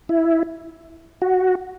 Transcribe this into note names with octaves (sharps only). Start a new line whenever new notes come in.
E4
F#4